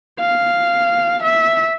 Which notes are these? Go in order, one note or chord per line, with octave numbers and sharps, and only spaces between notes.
F5
E5